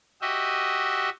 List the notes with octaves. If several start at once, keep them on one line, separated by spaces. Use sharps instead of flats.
F#4 G4 D#5 E5